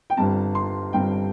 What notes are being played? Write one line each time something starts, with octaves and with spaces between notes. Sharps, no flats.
G5
G1 G2 G3 C4 A5
C6
G1 G2 G3 C4 G5